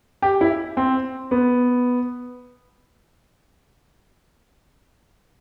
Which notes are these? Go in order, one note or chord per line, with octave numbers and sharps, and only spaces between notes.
G4
E4
C4
B3